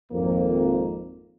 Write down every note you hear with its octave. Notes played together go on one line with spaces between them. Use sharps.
G#1 F2 A#3